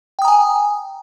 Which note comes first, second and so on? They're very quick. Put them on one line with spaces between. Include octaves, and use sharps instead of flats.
G5 D#6 A#5 G#5